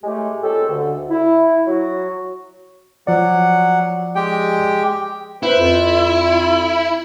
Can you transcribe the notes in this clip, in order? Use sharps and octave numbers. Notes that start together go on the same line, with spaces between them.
A2 G#3 A3 G4
A#2 G#3 C#4 G4 A4
D2 D3
E4
F#3 F#4
F3 F#3 D5 F#5
G#3 G4 G5
E4 B4 C5
F2 F4